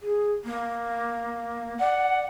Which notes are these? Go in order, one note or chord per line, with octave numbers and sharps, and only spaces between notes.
G#4
A#3
D5 F#5